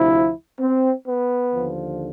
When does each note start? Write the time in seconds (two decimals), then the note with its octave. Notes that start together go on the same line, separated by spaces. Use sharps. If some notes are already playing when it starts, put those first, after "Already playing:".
Already playing: D2 C3 F3 E4
0.60 C4
1.05 B3
1.51 D#2 D3 F3